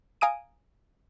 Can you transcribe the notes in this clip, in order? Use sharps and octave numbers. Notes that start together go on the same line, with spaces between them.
F5 G#5 A#5 D#6 D7 D#7